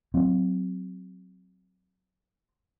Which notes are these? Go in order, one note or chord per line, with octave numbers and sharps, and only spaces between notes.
F#3 C4